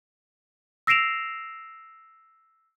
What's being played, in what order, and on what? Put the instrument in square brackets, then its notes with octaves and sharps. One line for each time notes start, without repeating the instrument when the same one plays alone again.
[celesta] E6 A#6 C7 D7 E7 F7